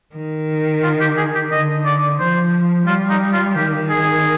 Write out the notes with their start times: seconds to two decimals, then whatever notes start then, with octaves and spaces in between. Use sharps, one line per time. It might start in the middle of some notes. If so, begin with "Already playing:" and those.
0.15 D#3
0.83 F4
1.01 G4
1.17 G#4
1.35 G4
1.51 D3 D#5
1.86 D5
2.19 F3 C5
2.87 G3 F4
3.10 D#4
3.33 F4
3.55 D#3 G4
3.90 G#4